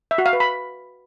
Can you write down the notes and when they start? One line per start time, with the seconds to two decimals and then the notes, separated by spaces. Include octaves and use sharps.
0.11 E5
0.18 F#4
0.26 F5
0.33 B4
0.40 B5